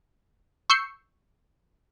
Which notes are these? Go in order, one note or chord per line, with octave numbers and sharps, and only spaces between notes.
C#6 E6 G6 C7 C#7